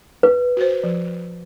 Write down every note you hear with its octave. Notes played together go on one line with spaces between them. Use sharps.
B4
F#4 C5
F3